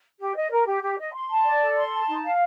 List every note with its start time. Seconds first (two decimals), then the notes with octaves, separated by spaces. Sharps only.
0.20 G4
0.36 D#5
0.50 A#4
0.66 G4
0.82 G4
0.99 D#5
1.13 C6
1.30 A5
1.45 D5
1.62 A4
1.76 C6
1.93 A5
2.08 D#4
2.24 F5